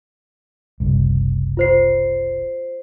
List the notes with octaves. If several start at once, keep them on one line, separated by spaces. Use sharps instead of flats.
F#1 C2
F4 C5 C7